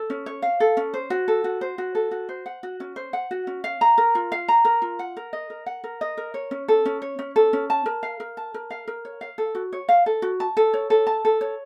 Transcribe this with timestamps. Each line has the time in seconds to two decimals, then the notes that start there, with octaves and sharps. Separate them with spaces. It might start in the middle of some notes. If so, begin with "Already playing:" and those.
Already playing: A4
0.10 C#4
0.26 C#5
0.42 F5
0.60 A4
0.77 C#4
0.94 C5
1.10 F#4
1.28 A4
1.44 F#4
1.61 C5
1.78 F#4
1.95 A4
2.11 F#4
2.29 C5
2.46 F#5
2.63 F#4
2.80 C#4
2.96 C5
3.13 F#5
3.31 F#4
3.47 C#4
3.64 F5
3.81 A#5
3.98 A#4
4.15 F4
4.32 F5
4.48 A#5
4.65 A#4
4.82 F4
4.99 F#5
5.17 A#4
5.33 D#5
5.50 A#4
5.66 F#5
5.84 A#4
6.01 D#5
6.17 A#4
6.34 C#5
6.51 C#4
6.68 A4
6.86 C#4
7.02 C#5
7.19 C#4
7.36 A4
7.53 C#4
7.70 A5
7.86 A#4
8.03 F5
8.20 A#4
8.37 A5
8.54 A#4
8.70 F5
8.88 A#4
9.05 C#5
9.21 F5
9.38 A4
9.55 F#4
9.73 C#5
9.89 F5
10.06 A4
10.22 F#4
10.40 A5
10.57 A4
10.74 C#5
10.90 A4
11.07 A5
11.25 A4
11.41 C#5